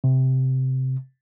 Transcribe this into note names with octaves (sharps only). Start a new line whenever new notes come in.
C3